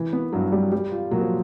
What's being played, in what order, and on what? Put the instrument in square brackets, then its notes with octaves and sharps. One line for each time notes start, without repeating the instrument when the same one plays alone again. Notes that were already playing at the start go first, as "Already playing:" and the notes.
Already playing: [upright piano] E3
B3
[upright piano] G2 [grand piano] F#3
[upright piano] G3
G3
F4
[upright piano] A#2 [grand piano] F#3
[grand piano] F3